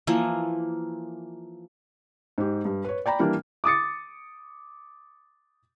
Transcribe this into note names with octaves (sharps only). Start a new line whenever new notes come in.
E3 F3 A#3
G#2 G4
G2
B4 C#5
D5 G5 A#5 B5
E3 G3 A#3 D4
D6 D#6 A6 C#7